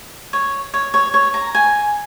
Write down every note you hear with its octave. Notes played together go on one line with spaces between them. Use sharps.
C#5
C#5
C#5
C#5
A#5
G#5